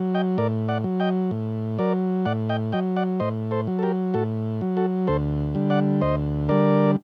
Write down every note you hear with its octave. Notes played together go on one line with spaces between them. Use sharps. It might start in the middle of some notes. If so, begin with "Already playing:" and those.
Already playing: F#3
D#5 G5
A2 A#4 D5
D5 F#5
F#3
D#5 G5
A2
F#3 A#4 D5
A2 D5 F#5
D#5 G5
F#3 D#5 G5
D5 F#5
A2 C5 D#5
A4 C5
F#3
A4
G4 A#4
A2 F#4 A4
F#3
F#4 A4
D2 A4 C5
D3 G3
D5 F#5
D2 C5 D#5
D3 G3 A#4 D5